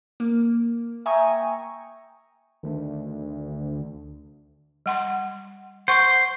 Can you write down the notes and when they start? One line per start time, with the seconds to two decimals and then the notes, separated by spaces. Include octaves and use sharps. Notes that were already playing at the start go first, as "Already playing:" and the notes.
0.20 A#3
1.06 E5 G5 G#5 A#5 C#6 D#6
2.63 D2 D#3 A3 D4
4.86 G3 F#5 C6
5.88 C5 F#5 C#6